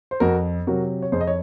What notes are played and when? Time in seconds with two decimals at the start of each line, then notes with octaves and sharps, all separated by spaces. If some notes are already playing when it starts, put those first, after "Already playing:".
0.11 C5
0.20 F2 F#4 A#4
0.67 C3 F#3 F#4 A#4
1.02 C#5
1.12 F2 G#4 C5
1.21 D#5
1.27 C#5